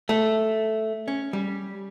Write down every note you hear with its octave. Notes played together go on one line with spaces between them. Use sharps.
A3
C#4
G3